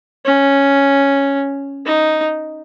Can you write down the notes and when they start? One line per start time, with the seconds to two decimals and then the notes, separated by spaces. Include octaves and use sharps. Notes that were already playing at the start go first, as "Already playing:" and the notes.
0.25 C#4
1.86 D#4